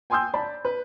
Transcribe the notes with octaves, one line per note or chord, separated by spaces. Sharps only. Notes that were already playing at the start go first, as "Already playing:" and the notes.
G5 G#5 C6 D#6 E6 G6
D5 A5 B5
B4